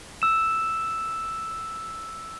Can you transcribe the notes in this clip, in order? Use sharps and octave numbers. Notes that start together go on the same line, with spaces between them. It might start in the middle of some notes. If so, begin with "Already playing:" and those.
E6 E7